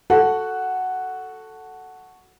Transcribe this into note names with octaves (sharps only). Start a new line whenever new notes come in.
F#4 A4 F#5